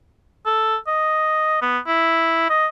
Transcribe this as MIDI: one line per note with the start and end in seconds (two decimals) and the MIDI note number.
0.46 0.76 69
0.87 1.58 75
1.62 1.79 59
1.87 2.45 64
2.50 2.67 75